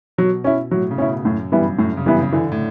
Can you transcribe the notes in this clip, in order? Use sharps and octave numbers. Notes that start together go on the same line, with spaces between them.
B2 F#3
C#4 E4
A2 F#3
C#3
B2 C#4 E4
F#2 A2
G2 E3 G3 B3 E4
F#2 A2
C#3
E3 G3 B3 E4
C#3
D3 E3
A2